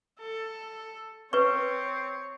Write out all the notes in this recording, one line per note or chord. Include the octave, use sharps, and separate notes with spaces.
A4
C4 B4 C#5 C#6